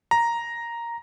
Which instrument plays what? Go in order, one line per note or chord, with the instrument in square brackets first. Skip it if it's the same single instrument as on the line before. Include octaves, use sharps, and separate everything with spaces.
[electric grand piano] A#5